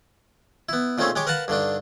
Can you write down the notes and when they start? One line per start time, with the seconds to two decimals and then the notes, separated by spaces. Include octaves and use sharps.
0.69 B3 E4
0.98 A#2 D#3 A3 C4 C#4 G#4
1.16 G#3 G4 C#5 D6
1.27 A#4 B4 F5 F#5 A5 B5
1.48 G2 D3 D#3 D4